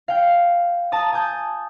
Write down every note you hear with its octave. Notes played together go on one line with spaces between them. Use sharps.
F5 G5
A5 A#5 D#6
G#5 A5 D#6 G6